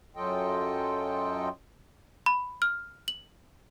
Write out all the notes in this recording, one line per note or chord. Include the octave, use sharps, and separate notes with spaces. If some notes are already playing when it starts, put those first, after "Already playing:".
F#2 F#3 F4 A4 D#5 G5
B5
F6
F#7